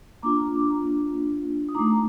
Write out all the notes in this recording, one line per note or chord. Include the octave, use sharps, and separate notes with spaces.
A#3 D4 F4 A#5 D6
D#6
A3 D#4 A#5 D6